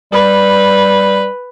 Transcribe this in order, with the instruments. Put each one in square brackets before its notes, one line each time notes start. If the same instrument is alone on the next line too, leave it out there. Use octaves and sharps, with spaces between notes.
[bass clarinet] G3 [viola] B4